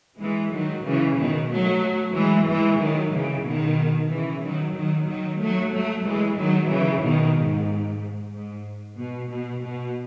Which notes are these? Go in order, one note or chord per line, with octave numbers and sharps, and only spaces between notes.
E3 G#3
D#3 F#3
C#3 E3
B2 D#3
F#3 A3
E3 G#3
E3 G#3
D#3 F#3
C#3 E3
B2 D#3
C#3 E3
D#3 F#3
D#3 F#3
D#3 F#3
F#3 A3
F#3 A3
E3 G#3
D#3 F#3
C#3 E3
B2 D#3
G#2
G#2
B2
B2
B2